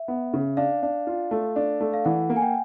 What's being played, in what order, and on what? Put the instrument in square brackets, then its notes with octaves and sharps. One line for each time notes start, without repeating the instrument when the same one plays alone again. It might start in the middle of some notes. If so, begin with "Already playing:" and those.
Already playing: [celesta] E5
[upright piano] B3
C#3
[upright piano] D4 [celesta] F5
[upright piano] D4
F4
A3
D4
A3
[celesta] F5
[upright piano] E3 [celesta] F#5
[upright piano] A#3
[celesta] G#5
G5